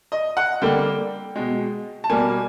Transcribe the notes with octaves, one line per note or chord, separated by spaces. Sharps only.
D#5
F#5
D3 G3 A#3 G5
B2 G#3
A5
B2 G3 A#3 G#5